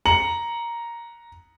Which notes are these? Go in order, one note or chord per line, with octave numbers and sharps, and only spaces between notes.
A#5 C#7 F#7